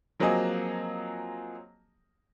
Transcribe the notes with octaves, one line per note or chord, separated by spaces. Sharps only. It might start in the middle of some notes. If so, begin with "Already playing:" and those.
F3 F#3 A#3 C4 G#4 D#5